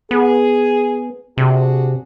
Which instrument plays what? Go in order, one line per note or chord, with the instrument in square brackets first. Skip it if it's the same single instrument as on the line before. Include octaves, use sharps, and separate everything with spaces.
[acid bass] B3 [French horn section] G#4
[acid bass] C3 [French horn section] D4 F#4 G#4